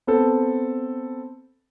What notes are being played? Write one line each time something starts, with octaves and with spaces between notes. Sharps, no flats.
B3 C4 A4